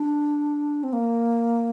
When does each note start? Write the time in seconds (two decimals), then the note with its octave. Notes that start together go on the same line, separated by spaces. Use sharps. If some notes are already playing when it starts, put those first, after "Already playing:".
Already playing: D4
0.83 C4
0.93 A#3